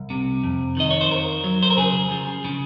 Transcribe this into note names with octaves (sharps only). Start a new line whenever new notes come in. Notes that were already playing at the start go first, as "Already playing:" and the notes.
Already playing: C2
C3
F2
D#3 D#5
C#5
C5
F2 A#4
F#3
C5
A#4
C#3 G#4
F3
C#3